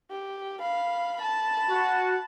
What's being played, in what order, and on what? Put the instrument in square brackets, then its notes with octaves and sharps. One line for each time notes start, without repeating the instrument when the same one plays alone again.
[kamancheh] G4
F5 B5
A5 B5
[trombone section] F#4